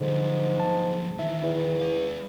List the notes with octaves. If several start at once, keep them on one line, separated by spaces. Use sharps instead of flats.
B1 G#2 D3 F3
A5
D#3 E3 E5
E2 E4
G#3 F5